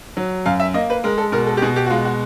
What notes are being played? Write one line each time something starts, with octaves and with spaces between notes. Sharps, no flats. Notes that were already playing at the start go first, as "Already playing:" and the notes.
F#3
F#2 F5
E5
A#3 D#5
B4
G#3 A#4
A4
B2 A#4
A4
G4
B2 G#4
G4
F#4
G#3 F4
F#4